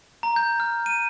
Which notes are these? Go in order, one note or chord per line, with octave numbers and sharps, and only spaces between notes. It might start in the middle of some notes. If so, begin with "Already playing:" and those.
A#5
G6
F6
D#7